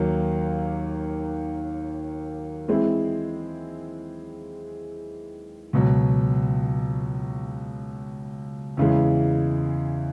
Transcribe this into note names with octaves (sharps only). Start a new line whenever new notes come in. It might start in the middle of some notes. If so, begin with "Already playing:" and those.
Already playing: D#2 D#3 F#3 A#3
E3 G#3 C4 E4
C#2 B2 F#3
E2 C#3 E3 G#3